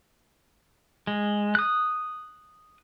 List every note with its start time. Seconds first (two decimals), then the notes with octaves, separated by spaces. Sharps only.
1.07 G#3
1.55 D#6 F#6